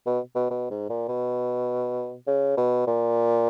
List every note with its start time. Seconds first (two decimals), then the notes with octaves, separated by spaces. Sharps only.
0.06 B2
0.35 B2
0.51 B2
0.70 G#2
0.89 A#2
1.09 B2
2.27 C#3
2.57 B2
2.87 A#2